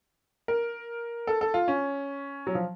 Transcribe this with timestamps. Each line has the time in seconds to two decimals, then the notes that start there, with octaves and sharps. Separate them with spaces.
0.48 A#4
1.27 A4
1.41 A4
1.54 F4
1.68 C#4
2.47 F#3
2.55 F3